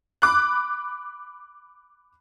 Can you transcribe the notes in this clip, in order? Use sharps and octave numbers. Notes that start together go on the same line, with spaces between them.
B5 D6 F#6